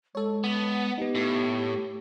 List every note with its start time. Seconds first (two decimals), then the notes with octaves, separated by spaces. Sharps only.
0.15 G#3 A4 C#5
0.44 B3
0.98 B3 D#4 G4
1.15 A2
1.58 G4